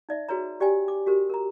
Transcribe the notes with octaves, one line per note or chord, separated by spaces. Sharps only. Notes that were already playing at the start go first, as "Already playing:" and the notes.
D#4 D5 E5
F#4 G#4 B4 C#5 A#5
G4 D5 G5 G#5
D6
F#4 G4 A#4 C5
A#4 A#5